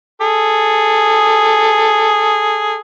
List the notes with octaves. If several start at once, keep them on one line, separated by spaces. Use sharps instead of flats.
G#4 A4